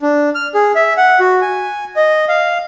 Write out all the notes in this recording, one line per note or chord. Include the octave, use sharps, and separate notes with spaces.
D4
F6
G#4
E5
F#5
F#4
G#5
D#5
F5